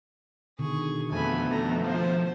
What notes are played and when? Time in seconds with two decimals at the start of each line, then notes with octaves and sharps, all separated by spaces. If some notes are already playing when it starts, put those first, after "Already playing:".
0.59 B2 D3 D#3 G#4 C#6
1.12 F2 A3 B3 G#5 B5
1.51 F2 A#5
1.84 F3 C5